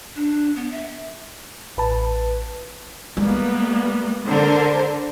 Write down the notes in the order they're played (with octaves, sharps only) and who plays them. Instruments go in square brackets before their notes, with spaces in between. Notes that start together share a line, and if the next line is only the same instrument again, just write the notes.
[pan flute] D4
B3
E5
[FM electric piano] A1 B4 A5
[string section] G3 A#3 B3 [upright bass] G#3
[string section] D3 A#4 C5